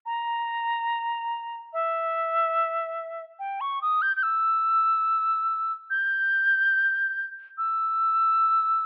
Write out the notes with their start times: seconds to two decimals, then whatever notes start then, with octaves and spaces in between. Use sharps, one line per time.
0.06 A#5
1.73 E5
3.39 G5
3.61 C#6
3.82 D#6
4.02 G6
4.17 G6
4.23 E6
5.90 G6
7.58 E6